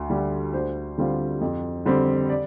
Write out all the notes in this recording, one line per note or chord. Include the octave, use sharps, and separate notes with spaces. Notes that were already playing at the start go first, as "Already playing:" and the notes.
Already playing: D2
D3 G3
D2 C5
D3 G3 C4 F4
F2
D3 G3 C4
D5